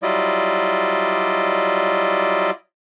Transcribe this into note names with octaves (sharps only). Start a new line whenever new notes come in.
F#3 G3 E4 F4 D5 D#5